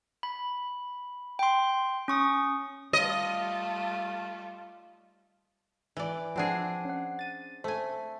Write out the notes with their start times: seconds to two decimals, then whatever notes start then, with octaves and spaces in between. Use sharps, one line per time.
0.23 B5
1.39 G5 C6
2.08 C#4 C#6 D#6
2.93 G3 A3 F4 D#5
5.97 E3 D5
6.36 F3 C4 D4 G#4 F#5 C7
6.85 C#4 F#5
7.19 A6 D#7
7.64 A3 C5 G#5